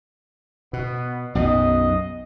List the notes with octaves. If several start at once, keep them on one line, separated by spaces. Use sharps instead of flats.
B2 B3
B1 F#2 B2 D#5